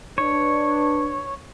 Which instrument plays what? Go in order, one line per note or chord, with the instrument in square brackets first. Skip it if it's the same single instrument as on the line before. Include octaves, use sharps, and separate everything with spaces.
[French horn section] D4 B4 [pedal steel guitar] C#5